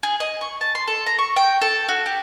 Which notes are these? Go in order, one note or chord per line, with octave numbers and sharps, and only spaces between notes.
G#4
D#5
C#6
A5
C6
A4
A#5
C#6
G5
A4
F#4
G4